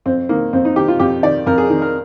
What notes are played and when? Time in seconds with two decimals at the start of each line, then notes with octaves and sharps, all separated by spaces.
0.06 F2 C4
0.29 D#3 A#3
0.53 F2 C4
0.65 D#4
0.76 D#3 G4
0.88 F4
1.00 F2 G4
1.23 D#3 D5
1.46 F2 A#4
1.58 G#4
1.69 D#3
1.82 A#4